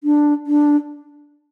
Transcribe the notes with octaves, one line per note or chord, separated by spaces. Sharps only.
D4
D4